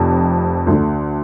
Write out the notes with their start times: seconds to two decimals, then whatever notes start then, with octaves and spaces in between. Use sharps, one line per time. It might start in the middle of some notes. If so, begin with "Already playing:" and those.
Already playing: F1 F2 C3
0.67 D2 D3